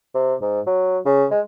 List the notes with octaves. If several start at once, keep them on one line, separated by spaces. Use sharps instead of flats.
C3
G#2
F#3
C#3
G#3